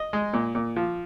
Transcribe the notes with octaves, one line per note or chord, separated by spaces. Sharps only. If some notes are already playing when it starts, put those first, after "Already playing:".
Already playing: D#5
G#3
A#2
A#2
F3